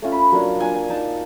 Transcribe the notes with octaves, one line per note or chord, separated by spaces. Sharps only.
A3 C#4 F4
B5
F#3 A#3 D4 F4
A#3 D4 F4 G#5
G#5
A#3 D#4 A5